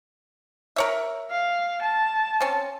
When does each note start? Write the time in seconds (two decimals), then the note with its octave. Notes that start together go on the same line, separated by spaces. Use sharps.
0.76 A#4 C#5 E5
1.30 F5
1.82 A5
2.41 C4 C#4